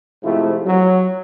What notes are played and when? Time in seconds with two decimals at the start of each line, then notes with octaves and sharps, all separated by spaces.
0.23 G#2 C3 F3 A3 E4 F4
0.66 F#3